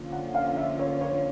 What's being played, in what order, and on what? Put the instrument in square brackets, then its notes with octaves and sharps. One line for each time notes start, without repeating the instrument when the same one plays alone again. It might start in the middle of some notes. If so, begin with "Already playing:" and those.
Already playing: [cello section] D3 F3 A#3 C#4 F4
[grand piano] F#5
F5
E5
C#5
C#5